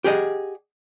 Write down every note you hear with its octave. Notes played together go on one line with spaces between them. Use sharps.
G4 G#4 D#5 F#5